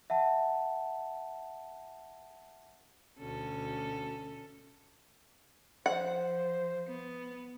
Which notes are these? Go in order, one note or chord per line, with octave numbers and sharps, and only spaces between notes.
E5 F#5 A5
D2 B2 C#4 A4
F3 C5 F#5
B3